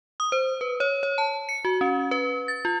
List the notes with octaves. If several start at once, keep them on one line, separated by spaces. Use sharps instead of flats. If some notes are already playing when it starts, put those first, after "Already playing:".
D#6
C5
B4
C#5
C#5
A5
C#7
F#4
C#4
B4
A6
F4